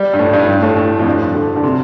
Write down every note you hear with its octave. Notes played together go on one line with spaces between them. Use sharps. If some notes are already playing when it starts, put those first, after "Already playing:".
Already playing: G3
G2
A2
G2
G2
A2
A2
F2
G2
D3
D3
C3